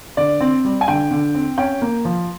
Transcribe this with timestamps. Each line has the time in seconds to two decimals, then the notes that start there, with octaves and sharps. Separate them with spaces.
0.17 D3 D5
0.40 C4
0.65 G3
0.81 G#5
0.88 D3 G5
1.11 D3
1.35 C4
1.58 C#4 G5
1.82 A#3
2.05 F3